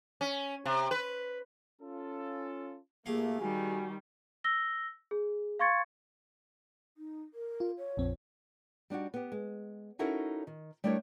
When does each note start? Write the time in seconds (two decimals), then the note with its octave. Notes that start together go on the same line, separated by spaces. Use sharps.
0.21 C#4
0.65 C3
0.91 B4
1.81 C#4 F4 A4
3.06 A#2 A3 A#3 G4 G#4 F5
3.40 D#3 G3 F#4 G#5
4.44 E6 A#6 G7
5.11 G#4
5.59 F5 C6 C#6 G#6 A6 C#7
6.97 D#4
7.34 A#4
7.60 F4
7.78 C#5
7.97 A#1 F2 C4
8.90 G3 D4 D#4 F#4
9.14 B3 G4
9.32 G#3
9.99 C#4 D#4 E4 F#4 A4 A#4
10.47 D#3
10.84 G3 A3 D4 E4 A#4 C#5